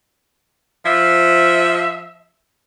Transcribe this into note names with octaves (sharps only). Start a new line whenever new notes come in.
F3 E5